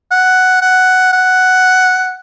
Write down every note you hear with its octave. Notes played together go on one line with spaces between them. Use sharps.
F#5
F#5
F#5